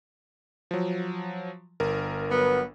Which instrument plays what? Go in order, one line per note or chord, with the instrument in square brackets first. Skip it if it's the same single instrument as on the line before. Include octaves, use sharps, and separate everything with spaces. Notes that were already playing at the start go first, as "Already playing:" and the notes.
[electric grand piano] F3 F#3
G1 A#4
[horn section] F#3 B3